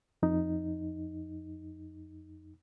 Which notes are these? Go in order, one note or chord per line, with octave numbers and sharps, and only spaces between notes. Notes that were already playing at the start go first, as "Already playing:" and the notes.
F2 D#4